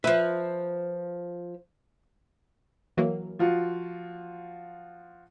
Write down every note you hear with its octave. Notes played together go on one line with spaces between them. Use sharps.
F3 B4 E5
E3 F#3 A#3
F3 F4 F#4